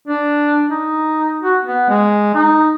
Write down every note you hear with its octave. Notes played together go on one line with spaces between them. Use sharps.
D4
D#4
F#4
B3
G#3
D#4